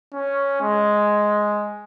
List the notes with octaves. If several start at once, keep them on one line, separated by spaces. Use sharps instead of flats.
C#4
G#3